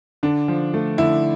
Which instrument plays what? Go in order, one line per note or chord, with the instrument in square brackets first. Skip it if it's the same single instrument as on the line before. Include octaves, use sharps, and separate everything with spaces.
[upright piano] D3 D4
F3
A3
D3 E4